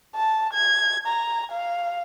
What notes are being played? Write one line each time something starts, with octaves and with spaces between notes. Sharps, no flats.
A5
G#6
A#5
F5